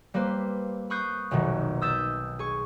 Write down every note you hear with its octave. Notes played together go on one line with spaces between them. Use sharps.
G3 A#3 C4 B4 C5
B5 C#6 D#6 F#6 G6 C7
F1 B1 B2 D#3
D#6 E6 G6 A6 B6 E7
G#4 C#6